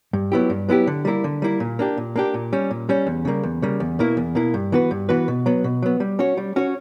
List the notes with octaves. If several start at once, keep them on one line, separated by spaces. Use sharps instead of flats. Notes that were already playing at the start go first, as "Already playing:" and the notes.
G2
F#3 B3 E4 G4
G2
F#3 B3 E4 G4
D3
G3 A#3 E4
D3
G3 A#3 E4
A#2
A#3 D4 G4
A#2
A#3 D4 G4
A#2
G3 C#4
A#2
G3 C#4
E2
C#3 G3 A#3
E2
C#3 G3 A#3
E2
B2 A#3 E4
E2
B2 A#3 E4
G2
E3 B3 F#4 B4
G2
E3 B3 F#4 B4
B2
F#3 B3
B2
F#3 B3
G3
C#4 F#4 C#5
G3
C#4 F#4 C#5